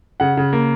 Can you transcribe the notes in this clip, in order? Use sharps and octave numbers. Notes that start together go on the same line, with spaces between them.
C#3 F#5
C#3
A#3